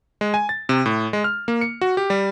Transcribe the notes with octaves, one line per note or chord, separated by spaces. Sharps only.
G#3
G#5
A6
C3
A2
G#3
F6
A#3
C#7
F#4
G4
G3